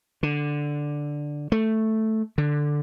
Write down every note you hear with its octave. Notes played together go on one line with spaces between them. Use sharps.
D3
A3
D3